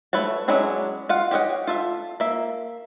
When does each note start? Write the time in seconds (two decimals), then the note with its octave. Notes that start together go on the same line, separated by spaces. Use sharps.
0.13 A3 B4 C#5 A5
0.48 F#3 G#3 C#4 D4 E4
1.09 F4 F5 F#5
1.31 G4 C#5 D#5 F#5
1.67 F4 A4 E5
2.20 A#3 E5